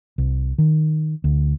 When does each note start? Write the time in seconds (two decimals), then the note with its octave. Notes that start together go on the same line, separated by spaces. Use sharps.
0.18 C2
0.58 D#3
1.24 D2